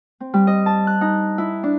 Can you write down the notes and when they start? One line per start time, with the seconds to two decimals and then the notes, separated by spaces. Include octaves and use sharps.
0.20 C4
0.34 G3
0.47 D#5
0.66 A5
0.87 F#6
1.01 D#4
1.38 E4
1.63 D4